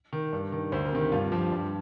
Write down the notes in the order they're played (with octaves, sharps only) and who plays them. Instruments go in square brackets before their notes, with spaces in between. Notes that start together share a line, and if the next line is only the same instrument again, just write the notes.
[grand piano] D#3
G2
D#3
D2 C5
A#4
C3 D#3
G2 F4
F3 G4
G2